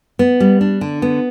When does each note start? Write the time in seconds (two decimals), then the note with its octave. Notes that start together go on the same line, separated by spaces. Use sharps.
0.19 B3
0.40 G3
0.61 D4
0.81 D3
1.02 B3